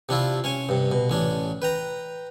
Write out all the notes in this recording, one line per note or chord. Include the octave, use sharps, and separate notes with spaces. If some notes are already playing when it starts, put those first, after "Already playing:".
C3 D4 E4 F4
C#4 C#5 G#5
G2 C3
B2
A1 C#4 D4
B4 G5 A#5